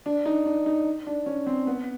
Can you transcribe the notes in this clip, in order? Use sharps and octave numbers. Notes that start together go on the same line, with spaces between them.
D4
D#4
D4
D#4
D4
C#4
C4
B3